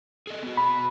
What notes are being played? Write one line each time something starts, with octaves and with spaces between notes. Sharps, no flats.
G#4 A4 D#5
B3 F#4
B5